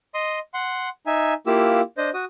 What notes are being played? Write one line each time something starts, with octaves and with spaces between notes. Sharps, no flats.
D#5 C6 D#6
F#5 C6
D#4 E5 G#5
A#3 E4 F4 G4 E6
D4 C5 D#5
F#4 D#6